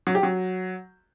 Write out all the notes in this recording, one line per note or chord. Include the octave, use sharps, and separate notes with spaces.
F#3
G4
F#3